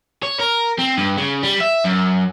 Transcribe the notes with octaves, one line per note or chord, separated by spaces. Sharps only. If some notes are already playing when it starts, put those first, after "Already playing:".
C#5
A#4
C4
G2
C#3
G3
E5
F#2